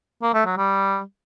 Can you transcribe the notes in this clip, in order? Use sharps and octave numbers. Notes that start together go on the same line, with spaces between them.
A#3
A3
F#3
G3